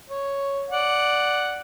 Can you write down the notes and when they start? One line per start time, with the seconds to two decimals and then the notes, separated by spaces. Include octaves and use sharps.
0.10 C#5
0.70 D5 F#5